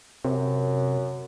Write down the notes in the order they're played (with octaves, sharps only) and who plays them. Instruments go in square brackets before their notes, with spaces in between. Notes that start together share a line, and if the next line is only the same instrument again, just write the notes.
[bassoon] F#2 [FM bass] C3